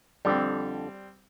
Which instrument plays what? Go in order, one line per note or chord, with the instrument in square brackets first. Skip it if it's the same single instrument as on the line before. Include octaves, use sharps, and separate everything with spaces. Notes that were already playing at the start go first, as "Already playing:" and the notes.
[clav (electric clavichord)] F2 D3 [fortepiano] G3 C4